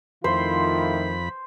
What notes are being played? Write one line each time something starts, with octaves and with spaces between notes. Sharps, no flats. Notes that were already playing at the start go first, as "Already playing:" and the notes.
F2 D#3 A3 E4 F4 C5 B5